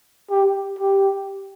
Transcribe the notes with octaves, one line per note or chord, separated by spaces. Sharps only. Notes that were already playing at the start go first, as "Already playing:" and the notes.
G4
G4